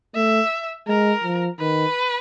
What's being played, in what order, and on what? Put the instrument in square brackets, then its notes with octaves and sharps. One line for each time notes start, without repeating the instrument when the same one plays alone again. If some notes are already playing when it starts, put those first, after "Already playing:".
[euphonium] A3 [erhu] E5
[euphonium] G#3 [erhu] A#4
[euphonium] F3
[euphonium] D#3 [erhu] B4